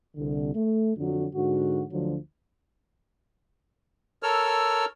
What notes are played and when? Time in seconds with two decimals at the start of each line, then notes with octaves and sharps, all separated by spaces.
0.16 C2 D3
0.55 A3
0.97 F2 D3 F#3
1.35 G#2 D3 F#4
1.91 D2 D3 F3 F#3
4.23 A4 A#4 C#5 E6 F6